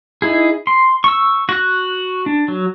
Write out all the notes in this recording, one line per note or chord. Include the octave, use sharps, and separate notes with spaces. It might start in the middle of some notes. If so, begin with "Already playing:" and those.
D#4 E4 G#4
C6
C#6 E6
F#4 F#6
D4
F#3